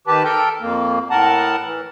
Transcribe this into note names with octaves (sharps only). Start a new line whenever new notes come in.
D#3 G4 B4 A5
A4 A#4 G5
F2 A#3
A2 A#4 F#5 A5
E3